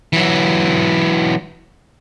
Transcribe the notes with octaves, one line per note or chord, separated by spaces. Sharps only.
E3 F#3